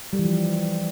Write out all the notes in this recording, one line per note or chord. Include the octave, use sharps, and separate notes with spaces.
G3
E3
F3